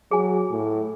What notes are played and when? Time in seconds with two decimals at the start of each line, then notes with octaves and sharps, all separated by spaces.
0.11 F#3 G#4 G#5
0.50 A2